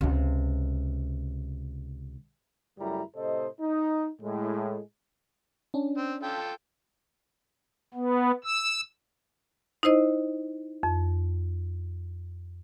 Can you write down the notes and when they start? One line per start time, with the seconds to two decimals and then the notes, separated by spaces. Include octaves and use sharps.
0.01 C#2 C3
2.79 F#2 C#3 G3 A3 E4 A#5
3.16 A2 C3 A4 C5 D#5
3.61 D#4
4.22 A2 G#3
5.74 C#4 D4
5.98 C4
6.23 F4 A4 G5
7.94 B3
8.44 E6
9.83 D#4 E4 C5 D#5
10.83 F2